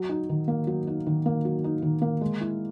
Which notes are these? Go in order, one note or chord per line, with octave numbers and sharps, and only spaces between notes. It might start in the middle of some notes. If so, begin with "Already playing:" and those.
Already playing: F#3
D#4
D#3
A#3
F#3
D#4
D#3
A#3
F#3
D#4
D#3
A#3
G#3
E4